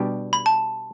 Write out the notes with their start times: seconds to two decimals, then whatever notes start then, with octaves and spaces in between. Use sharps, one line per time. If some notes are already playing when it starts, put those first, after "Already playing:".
Already playing: B2 G3 D4 G4
0.33 B5
0.46 A5